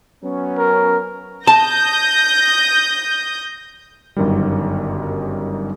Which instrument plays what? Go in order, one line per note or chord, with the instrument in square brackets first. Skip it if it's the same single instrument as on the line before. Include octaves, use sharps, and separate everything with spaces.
[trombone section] F#3 B3 C#4
[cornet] A#4
[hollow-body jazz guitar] A5 [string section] D#6 G6 A#6
[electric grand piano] G1 F#2 D#3 G3